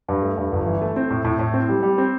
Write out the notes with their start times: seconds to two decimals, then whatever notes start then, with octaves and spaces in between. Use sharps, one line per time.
0.09 G2
0.22 A3
0.38 G2
0.52 G1
0.66 E3
0.81 A3
0.96 C4
1.10 A2
1.25 A2
1.39 A2
1.54 C4
1.69 G3
1.83 G3
1.98 C4